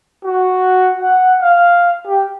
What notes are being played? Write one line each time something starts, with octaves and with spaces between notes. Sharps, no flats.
F#4
F#5
F5
G4